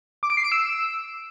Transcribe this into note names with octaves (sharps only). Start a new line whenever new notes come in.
D6
D7
C7
D7
E6